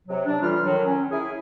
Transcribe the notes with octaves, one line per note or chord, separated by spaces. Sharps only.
C3 F#3
D4
A2 E3 G3 F4 F6
A2 D#3 F#3
C#4
E4 G#4